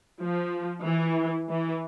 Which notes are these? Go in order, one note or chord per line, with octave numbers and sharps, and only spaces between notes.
F3
E3
E3